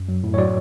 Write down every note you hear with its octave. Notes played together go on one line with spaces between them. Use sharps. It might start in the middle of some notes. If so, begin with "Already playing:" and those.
Already playing: F#2
F#3
A2
C#5
F#3 D5